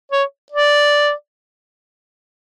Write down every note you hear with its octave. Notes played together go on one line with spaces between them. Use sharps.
C#5
D5